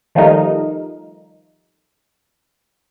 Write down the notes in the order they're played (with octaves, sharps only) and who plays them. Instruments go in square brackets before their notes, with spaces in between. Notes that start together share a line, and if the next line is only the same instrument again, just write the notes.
[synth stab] D#3 F3 G3 A3 D#4 A#4